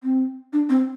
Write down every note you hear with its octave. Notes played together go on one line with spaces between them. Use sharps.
C4
D4
C4